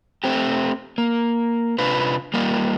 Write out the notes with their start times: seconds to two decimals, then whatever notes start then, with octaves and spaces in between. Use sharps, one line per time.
0.24 A3 C4 G4
0.98 A#3
1.78 C3 D4 F4 B4
2.34 G3 A#3 F4